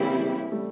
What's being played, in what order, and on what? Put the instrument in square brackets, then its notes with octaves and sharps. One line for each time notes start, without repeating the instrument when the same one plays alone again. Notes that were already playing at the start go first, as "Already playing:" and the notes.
Already playing: [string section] C#3 E3 G3 C4 E4 [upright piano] G#3 A#3
[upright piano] G3 A3